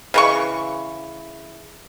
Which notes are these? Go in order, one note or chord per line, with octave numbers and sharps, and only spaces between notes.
C#3 E3 C#6